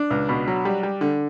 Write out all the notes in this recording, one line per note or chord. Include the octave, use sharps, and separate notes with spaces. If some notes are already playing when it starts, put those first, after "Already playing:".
Already playing: D4
C#2
B2
F#3
G3
G3
D3